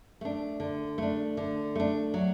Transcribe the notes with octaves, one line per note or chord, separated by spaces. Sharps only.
A3 D4
D3
A3 D4
D3
A3 D4
F#3